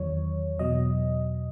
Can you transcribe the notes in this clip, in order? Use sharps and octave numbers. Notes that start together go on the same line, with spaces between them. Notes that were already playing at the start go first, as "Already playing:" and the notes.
Already playing: E2 D#3 F#3 C#5
E2 B2 F#3 D#5